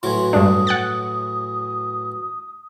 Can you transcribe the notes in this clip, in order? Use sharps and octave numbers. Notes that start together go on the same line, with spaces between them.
A2 E3 F#3 C6
G2 D4 D#6
F#5 F#6 A6